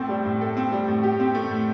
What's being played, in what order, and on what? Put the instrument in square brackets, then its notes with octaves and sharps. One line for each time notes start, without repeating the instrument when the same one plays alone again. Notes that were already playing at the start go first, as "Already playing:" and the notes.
Already playing: [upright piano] A2 C4 A4
G3
A2
A4
C4
G3
A2
G4
C4
A3
A2